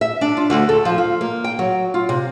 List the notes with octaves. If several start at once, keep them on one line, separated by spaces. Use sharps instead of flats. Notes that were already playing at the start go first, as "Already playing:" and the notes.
E5
D4
F4
D2
A4
F3
F4
A#3
G5
F#3
F4
C3